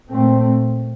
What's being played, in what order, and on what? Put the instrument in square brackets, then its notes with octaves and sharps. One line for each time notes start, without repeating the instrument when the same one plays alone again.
[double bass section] A#2 A3 C4